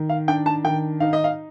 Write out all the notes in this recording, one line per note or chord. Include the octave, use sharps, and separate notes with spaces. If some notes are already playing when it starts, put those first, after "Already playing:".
Already playing: D#3
F5
D4 G5
A5
D#3 G5
D#4 F5
D#5
F5